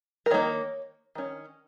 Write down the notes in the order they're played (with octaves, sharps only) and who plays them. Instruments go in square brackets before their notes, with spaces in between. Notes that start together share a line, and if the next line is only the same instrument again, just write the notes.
[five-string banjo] A#4
D#3 A#3 D#4 C#5
D#3 C#4